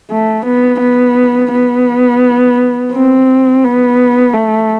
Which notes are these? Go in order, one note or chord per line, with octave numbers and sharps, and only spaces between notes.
A3
B3
B3
B3
C4
B3
A3